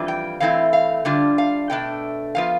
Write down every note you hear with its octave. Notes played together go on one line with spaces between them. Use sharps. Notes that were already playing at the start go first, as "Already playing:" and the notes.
Already playing: F2 E3 G3 D4 F4
G5
E3 A3 C4 E4 F5
F5
D3 G3 D4 F4
F5
B2 A3 D4 G5
F3 B3 F4 F5